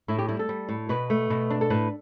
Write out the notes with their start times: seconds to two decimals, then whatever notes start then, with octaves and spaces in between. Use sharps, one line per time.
0.08 A2 E4
0.19 G4
0.29 G3 E4
0.39 A4
0.49 G3
0.69 A2
0.89 B2 B4
1.10 A3
1.30 B2
1.50 D4
1.61 A4
1.70 A2 B4